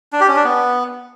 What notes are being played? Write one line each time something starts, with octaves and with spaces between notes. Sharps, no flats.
D4
G4
C#4
D4
B3